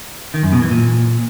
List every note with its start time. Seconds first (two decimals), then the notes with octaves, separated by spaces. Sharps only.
0.34 D#3
0.43 F#2
0.53 B2
0.62 E3
0.71 A#2